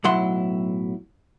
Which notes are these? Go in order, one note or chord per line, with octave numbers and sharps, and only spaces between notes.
B1 A2 F#3 E4 F#5 C6